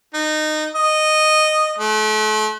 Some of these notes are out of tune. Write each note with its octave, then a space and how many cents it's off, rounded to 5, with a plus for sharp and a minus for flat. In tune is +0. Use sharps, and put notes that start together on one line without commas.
D#4 -20
D#5 -10
A3 -35